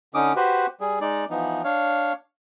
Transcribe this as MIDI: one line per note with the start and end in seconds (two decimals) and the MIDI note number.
0.14 0.33 50
0.14 0.33 61
0.14 0.33 63
0.14 0.33 86
0.14 0.33 87
0.36 0.66 66
0.36 0.66 67
0.36 0.66 71
0.36 0.66 72
0.81 0.99 55
0.81 0.99 68
1.01 1.25 56
1.01 1.25 63
1.01 1.25 74
1.30 1.62 52
1.30 1.62 53
1.30 1.62 59
1.30 1.62 63
1.64 2.13 62
1.64 2.13 73
1.64 2.13 77